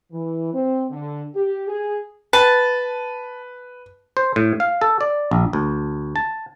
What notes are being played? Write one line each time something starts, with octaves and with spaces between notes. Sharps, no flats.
E3
C4
D3
G4
G#4
B4 A5
C5
A2
F5
A4
D5
A#1
D2
A5